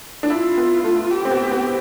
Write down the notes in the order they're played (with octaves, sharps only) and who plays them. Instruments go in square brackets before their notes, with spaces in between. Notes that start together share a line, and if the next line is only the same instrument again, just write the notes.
[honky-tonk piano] D4
[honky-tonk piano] E4 [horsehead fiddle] F4
[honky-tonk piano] B3
A3
[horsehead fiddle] G4
[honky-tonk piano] C4
B3
B3